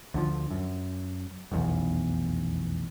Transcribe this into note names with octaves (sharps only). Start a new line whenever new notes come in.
D2 D3 F3
F#2
F1 B1 E2